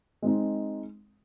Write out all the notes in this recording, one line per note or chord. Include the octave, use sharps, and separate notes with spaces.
G#3 C4 D#4